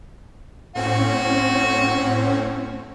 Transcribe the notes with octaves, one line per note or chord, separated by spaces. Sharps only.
A2 C4 C#4 F#4